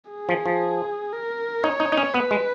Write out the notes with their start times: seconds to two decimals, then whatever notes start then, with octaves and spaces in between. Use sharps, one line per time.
0.11 G#4
0.29 F3
0.46 F3
1.13 A#4
1.64 D#4 C#5
1.80 D#4
1.92 D#4
1.97 C#4
2.14 B3 B4
2.31 G#3